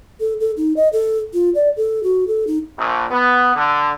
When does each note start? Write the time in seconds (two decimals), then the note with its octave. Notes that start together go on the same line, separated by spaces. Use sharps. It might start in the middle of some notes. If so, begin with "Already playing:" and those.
0.20 A4
0.40 A4
0.57 D#4
0.77 D#5
0.93 A4
1.34 F4
1.55 D5
1.77 A4
2.03 F#4
2.28 A4
2.47 D#4
2.77 A#1
3.11 B3
3.55 D3